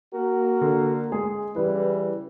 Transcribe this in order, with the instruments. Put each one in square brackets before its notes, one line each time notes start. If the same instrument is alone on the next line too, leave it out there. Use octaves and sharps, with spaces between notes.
[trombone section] A#3 F#4 A#4
[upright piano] D3
G#3 G#4
[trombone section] C#3 E3 G3 [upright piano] B4